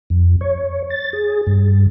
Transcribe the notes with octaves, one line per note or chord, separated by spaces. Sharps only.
F2
C#5
A6
G#4
G2